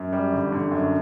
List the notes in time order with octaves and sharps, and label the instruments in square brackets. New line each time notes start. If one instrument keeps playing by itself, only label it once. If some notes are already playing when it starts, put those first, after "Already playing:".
Already playing: [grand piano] F#2
G3
G1
D3
F#2